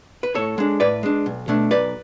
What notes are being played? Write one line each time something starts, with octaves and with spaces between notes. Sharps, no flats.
B4
A2 A4 C#5
G#3 D4
A2 B4 D5
G#3 D4
B1
B2 A3 D4
B1 B4 D5